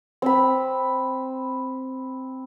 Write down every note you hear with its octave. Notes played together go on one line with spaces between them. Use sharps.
C4 B5